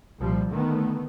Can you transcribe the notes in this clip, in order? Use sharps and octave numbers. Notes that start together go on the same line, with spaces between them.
C2 A#2 F3 G3
D3 D#3 A3 B3